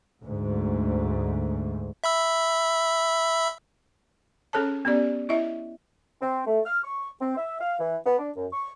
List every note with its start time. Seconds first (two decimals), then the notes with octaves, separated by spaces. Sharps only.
0.22 D2 G#2
2.04 E5 B5 E6
4.53 C#4 G#4 A4 C#5 A5
4.85 B3 C#4 G4 D5
5.29 E4 D#5 E5
6.21 C4
6.47 A3
6.66 F6
6.84 C#6
7.21 C4
7.37 E5
7.60 F5
7.80 E3
8.06 B3
8.19 D4
8.36 F#2
8.53 C#6